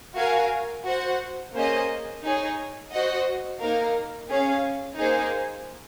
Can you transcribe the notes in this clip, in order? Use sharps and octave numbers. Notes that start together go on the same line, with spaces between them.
F#4 A#4 F5 G#5
F#4 C5 F#5
A#3 C#4 G#4 C5 D#5
D#4 G#4 C#5
F#4 C5 D#5 F#5
A#3 D#4 A#4 F5
C#4 G#4 C#5 F5
A#3 D#4 G#4 C5